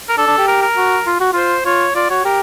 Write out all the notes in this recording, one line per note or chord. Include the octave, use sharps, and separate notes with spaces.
A#4
D4 A4
D4
G4
A#4
A#4
F#4
F4
F#4
F4 C5
F4 C#5
F4 D5
F#4 C#5
G4 A#4